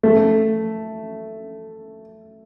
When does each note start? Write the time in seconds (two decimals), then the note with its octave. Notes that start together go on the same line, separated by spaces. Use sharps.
0.03 A3